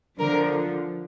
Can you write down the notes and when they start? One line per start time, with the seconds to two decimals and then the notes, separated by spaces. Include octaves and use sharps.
0.19 D3 F3 A#4